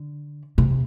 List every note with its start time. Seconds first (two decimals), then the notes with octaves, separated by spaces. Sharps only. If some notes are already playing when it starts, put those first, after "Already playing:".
Already playing: D3
0.58 C3